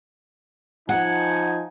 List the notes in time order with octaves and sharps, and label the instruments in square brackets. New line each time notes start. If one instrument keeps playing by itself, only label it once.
[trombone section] F3 D#4 [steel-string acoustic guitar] F#5 [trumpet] G#5